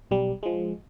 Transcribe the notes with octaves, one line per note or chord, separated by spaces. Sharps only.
B1 G3
F3 G#3